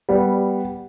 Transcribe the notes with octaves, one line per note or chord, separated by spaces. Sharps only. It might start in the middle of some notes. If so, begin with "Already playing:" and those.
G3 B3